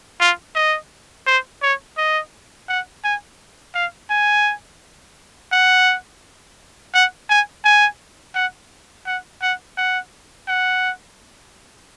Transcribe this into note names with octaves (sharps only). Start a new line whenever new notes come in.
F4
D#5
C5
C#5
D#5
F#5
G#5
F5
G#5
F#5
F#5
G#5
G#5
F#5
F#5
F#5
F#5
F#5